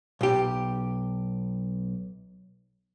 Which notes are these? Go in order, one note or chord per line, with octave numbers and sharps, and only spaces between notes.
B1 G4